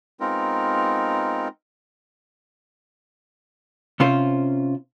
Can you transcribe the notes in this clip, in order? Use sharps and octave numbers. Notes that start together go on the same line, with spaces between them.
G#3 B3 C4 D#4 F4 A#4
C3 C#4 F4 C5